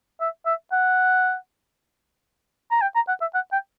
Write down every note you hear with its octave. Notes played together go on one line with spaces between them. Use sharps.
E5
E5
F#5
A#5
G5
A#5
F#5
E5
F#5
G5